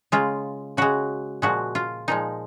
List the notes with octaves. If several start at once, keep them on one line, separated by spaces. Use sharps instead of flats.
C#3 G#3 F4
C#3 G#3 F#4
A#2 F3 G#3 F#4
F4
A#2 F3 G#3 D#4